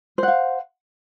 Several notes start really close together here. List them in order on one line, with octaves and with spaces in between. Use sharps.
C5 F#5 F5